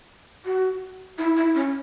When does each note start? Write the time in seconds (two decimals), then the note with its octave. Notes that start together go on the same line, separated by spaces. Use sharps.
0.46 F#4
1.18 E4
1.37 E4
1.55 C#4